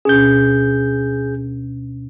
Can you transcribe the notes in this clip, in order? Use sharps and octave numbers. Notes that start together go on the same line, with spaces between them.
D2 B2 C#4 G#4 G6